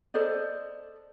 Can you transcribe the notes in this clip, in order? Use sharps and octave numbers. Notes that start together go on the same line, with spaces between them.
A4 C5 D5 D#5